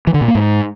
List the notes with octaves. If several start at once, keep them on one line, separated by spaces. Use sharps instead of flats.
E3
D3
A#2
A#3
G#2